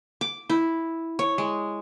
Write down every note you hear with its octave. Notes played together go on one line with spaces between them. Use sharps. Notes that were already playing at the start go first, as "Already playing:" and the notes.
D6
E4
C#5
G#3